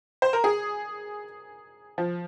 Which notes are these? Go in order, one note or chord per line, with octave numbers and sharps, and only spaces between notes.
C5
A#4
G#4
F3